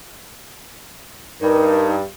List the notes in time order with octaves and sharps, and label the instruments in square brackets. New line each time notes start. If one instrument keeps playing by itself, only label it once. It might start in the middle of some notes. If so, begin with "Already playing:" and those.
[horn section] G2 [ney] D#4 [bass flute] A#4